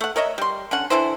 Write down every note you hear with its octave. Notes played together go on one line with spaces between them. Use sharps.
A3 F#5
A#4 C#5 D#5 E5
G3 C6
D3 C#4 F#5
D3 E3 E4 C5